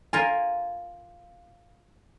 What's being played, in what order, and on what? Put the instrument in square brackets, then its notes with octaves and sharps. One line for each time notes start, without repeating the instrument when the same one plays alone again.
[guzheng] F4 A#4 [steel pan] G#5